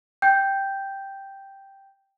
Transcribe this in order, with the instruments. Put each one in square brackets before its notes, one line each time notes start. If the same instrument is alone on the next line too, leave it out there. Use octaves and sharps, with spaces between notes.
[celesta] G5 G6